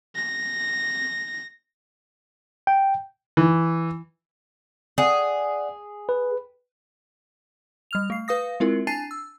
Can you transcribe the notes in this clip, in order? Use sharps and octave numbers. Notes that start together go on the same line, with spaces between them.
A#6
G5
E3
G#4 D5 F#5
B4
G3 F6 F7
A3 C7
B4 F5 D#6 A#6
G#3 C4 E4 F4 A#4
D4 G#5 A5 A6 C7 D#7
E6